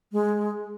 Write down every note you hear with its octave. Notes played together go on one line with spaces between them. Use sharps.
G#3